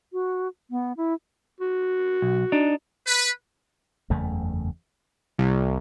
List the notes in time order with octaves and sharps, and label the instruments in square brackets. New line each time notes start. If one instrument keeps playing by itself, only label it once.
[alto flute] F#4
B3
E4
[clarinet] F#4
[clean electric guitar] B1
D4 D#4
[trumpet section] B4
[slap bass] F#1 E2 C#3 A3
[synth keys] C2